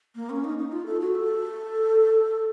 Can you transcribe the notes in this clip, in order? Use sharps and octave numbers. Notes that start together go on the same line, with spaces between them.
A#3
C#4
D#4
D#4
F4
A4
F#4
A4